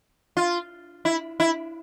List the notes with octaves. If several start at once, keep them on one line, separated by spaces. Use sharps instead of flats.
F4
E4
E4